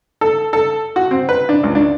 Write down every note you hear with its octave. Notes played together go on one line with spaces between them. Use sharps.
A4
A4
F#4
C4
B4
D4
C#2
D4